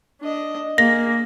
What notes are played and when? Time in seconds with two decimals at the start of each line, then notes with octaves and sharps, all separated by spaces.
0.21 D4 D#5
0.78 A#3 G#4 A#6